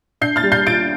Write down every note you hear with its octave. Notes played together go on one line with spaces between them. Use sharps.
D4 G6 C7
F6 A6
G3
G6 C7
F4 A6 D7